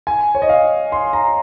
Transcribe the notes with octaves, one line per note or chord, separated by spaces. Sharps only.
G#5
C#5
D#5
F5
C6
A#5